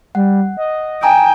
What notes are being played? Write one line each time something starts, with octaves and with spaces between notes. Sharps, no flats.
G3 F#5
D#5
G5 G#5 A#5 D#6